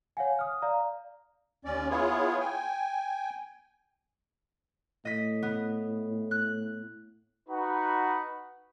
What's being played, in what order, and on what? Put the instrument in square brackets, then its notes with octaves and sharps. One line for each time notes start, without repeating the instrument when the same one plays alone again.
[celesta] C#5 F5 F#5 G#5
D#6 F6
D5 F5 A#5
[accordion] D#2 C#4 D5
B3 E4 F4 G#4 C#5
G5 G#5
[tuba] A2 [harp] D#5 B6
[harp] B3
F#6
[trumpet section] D#4 F#4 B4 F#5 B5